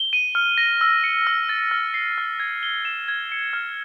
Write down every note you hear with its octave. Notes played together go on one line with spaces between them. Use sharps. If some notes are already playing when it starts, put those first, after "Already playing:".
Already playing: G7
D#7
F6
A#6
E6
C#7
E6
A6
F6
C7
F6
G#6
G7
E7
G#6
C#7
F6